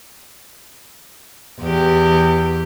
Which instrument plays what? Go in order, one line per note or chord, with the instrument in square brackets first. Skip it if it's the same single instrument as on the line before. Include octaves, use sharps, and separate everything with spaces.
[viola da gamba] E2 G4